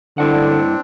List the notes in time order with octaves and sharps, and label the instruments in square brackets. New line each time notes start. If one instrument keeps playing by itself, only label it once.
[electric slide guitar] G2 E4 F#5 [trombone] D3 [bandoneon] C4 D4